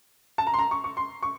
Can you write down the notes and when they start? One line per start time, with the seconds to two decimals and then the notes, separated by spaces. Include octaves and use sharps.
0.38 A5
0.47 A#5
0.54 C6
0.59 A#5
0.71 C#6
0.84 C#6
0.97 C6
1.23 C#6